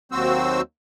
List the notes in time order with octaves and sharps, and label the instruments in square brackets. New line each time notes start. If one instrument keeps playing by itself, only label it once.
[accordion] D#2 F#3 C4 F#4 C5 E6